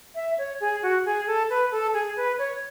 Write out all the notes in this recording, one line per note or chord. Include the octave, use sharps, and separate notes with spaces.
E5
C#5
G#4
F#4
G#4
A4
B4
A4
G#4
B4
C#5